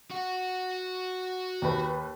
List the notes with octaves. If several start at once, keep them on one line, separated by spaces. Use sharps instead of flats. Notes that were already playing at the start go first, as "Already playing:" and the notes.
F#4 F#5
D#2 B4